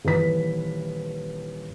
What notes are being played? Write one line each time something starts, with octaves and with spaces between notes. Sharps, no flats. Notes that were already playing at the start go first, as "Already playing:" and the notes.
D#1 E3 B4 B6